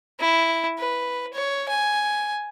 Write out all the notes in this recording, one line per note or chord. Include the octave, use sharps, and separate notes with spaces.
E4
B4
C#5
G#5